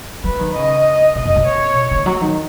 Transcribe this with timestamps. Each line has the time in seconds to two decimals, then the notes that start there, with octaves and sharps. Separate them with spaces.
0.24 F#3 B4
0.39 D#3
0.55 C#3 D#5
1.15 B2 D#5
1.26 F#2
1.36 B2
1.46 C#5
1.91 D#3
2.06 F#3
2.21 D#3